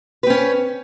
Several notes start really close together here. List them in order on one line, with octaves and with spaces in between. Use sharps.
B4 C4 C#4